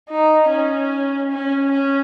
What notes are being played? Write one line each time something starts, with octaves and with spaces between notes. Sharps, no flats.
D#4
C#4
C#4
C#4